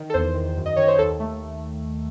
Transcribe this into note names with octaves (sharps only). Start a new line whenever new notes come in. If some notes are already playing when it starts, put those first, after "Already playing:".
Already playing: D#3
A4
E2 C5
D#3
F#2
D#5
D#3 C#5
C5
D#2 A4
A3